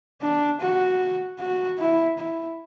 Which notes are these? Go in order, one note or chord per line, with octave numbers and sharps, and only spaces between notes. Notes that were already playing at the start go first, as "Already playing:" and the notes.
D4
F#4
F#4
E4
E4